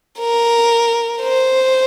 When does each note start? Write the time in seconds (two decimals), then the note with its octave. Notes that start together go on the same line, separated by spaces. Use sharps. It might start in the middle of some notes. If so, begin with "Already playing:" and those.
0.19 A#4
1.22 C5